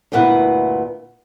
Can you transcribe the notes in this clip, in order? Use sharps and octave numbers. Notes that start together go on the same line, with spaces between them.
D2 G2 A#2 B3 E4 F#5